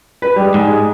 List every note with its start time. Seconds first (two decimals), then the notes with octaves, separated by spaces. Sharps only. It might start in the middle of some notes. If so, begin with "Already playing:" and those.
0.22 B4
0.36 G3 G#3
0.54 G#2
0.67 G#3